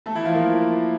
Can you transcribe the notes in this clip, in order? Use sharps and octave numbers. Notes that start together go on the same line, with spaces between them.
A3 A4
E3 E4
F3 F4
A#3 A#4